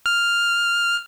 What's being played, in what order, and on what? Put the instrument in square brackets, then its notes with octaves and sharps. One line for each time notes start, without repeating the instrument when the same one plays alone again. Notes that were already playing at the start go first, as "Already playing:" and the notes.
[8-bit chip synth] F6